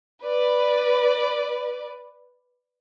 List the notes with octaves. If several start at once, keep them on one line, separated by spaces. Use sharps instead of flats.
B4 D5